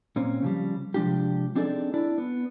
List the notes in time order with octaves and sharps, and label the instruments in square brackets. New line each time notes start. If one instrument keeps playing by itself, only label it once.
[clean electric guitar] A#2 C4 C#4
C#3 F3 G3
C3 F3 G#3 D4 F4 G4
C4 D4 D#4 G#4 A4 D5
D4 E4 D5
B3